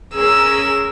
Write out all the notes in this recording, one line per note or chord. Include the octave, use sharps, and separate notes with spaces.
C#4 G#4 A#4 E6